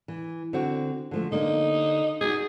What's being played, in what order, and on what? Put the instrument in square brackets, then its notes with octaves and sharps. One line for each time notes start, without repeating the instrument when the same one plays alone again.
[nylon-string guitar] E3
D3 C4 F#4
D3 F3 A3
[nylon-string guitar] D3 A#3 [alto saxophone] D#4
[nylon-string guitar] D#4 F#4 [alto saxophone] G#4